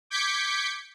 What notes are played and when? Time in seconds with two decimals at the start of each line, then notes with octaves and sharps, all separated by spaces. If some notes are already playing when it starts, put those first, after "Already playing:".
0.10 D6 G6 G#6 B6 C#7